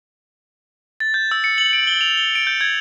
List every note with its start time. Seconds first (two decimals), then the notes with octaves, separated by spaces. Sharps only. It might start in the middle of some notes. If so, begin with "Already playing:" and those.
1.00 A6
1.14 G6
1.31 E6
1.44 C#7
1.58 F#7
1.73 D7
1.87 G7
2.01 F7
2.17 G7
2.35 D7
2.47 G6
2.61 G#6